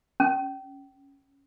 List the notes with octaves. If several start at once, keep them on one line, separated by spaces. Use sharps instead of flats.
C#4